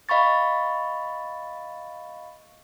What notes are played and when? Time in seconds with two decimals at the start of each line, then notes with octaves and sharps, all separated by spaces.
0.09 D#5 F5 B5 C#6 A6